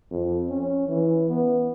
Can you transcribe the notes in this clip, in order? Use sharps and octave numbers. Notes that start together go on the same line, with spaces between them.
F2
C#4
E3
B3